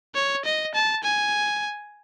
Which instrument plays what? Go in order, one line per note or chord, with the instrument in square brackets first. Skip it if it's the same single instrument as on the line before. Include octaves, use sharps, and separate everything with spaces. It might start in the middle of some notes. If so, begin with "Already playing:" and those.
[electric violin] C#5
D#5
A5
G#5